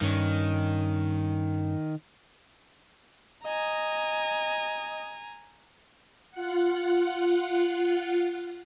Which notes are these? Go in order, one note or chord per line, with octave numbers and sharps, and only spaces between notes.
G2 D#3 C#4
D#5 G#5 A#5
F4 F#5